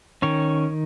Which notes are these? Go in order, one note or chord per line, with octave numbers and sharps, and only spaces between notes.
D#3 C#4 C#5